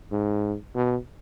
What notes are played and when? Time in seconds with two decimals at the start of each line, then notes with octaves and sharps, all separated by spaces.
0.12 G#2
0.75 B2